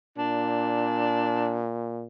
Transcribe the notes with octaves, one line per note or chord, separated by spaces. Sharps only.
A#2 D4